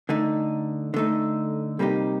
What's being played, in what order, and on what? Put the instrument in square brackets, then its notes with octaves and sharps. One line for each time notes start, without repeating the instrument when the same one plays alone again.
[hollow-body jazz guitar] D3 A3 D#4
D3 A3 D#4
C3 G3 A#3 D#4 G4